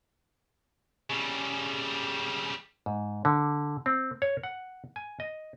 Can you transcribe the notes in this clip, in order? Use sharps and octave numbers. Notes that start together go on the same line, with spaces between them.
C#3 G3
G#2
D3
C4
C#5
F#5
G#5
D#5